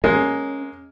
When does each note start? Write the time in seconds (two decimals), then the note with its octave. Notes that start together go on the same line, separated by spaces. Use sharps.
0.04 G#3 A#3 C#4